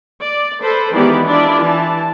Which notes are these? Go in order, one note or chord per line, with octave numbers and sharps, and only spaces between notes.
D5
A4 B4 C5
D#3 E3 G#3 B3 G4 D5
D4 E4 F4 D5
E3 A5